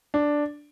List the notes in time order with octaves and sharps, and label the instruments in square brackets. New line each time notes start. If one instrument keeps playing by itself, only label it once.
[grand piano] D4